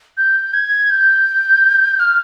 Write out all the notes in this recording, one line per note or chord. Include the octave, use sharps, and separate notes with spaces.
G6
G#6
G6
F6